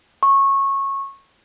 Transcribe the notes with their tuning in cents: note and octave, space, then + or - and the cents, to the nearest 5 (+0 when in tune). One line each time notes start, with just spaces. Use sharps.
C#6 -20